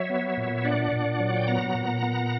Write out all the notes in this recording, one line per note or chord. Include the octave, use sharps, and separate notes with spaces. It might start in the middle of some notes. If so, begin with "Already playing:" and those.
Already playing: F#3 C#5 E5
B3
A#2
D4 D5 F#5
A#2
F#3
G5
B3 F#5 A#5
A#2
B3